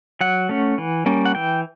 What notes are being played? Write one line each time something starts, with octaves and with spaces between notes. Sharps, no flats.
F#3 F#5
A3 C#4
E3
G3 A#3 C#4
F#5
E3 G5